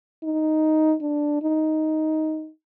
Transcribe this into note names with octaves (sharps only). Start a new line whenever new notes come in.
D#4
D4
D#4